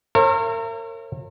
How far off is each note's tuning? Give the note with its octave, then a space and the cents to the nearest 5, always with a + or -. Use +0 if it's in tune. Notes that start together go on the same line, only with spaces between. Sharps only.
A#4 -35 C#5 -45 E5 +40